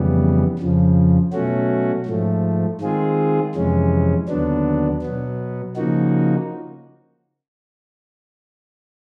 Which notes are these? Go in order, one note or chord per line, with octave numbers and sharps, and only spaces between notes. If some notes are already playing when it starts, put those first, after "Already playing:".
Already playing: F2 C#3 E3 G3 B3
F2 C#3 F3
B2 F#3 A3 C#4 F#4
G#2 F3 A3
D#3 G#3 C4 F4 G#4
F2 C3 E3 G#3 C#4
D#2 D3 F#3 B3 D4
B2 F#3 B3
C#3 F3 A#3 D#4 F#4